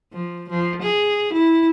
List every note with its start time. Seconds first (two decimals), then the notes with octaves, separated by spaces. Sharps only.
0.13 F3
0.50 F3
0.83 G#4
1.34 E4